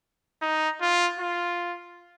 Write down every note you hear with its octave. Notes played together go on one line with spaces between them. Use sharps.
D#4
F4
F4